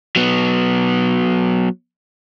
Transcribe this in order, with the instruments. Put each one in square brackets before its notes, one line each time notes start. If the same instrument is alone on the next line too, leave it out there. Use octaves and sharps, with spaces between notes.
[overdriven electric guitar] F#3 B3